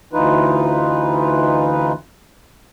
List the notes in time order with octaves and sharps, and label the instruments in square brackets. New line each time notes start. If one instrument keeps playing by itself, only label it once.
[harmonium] D2 E3 D#4 F4 B4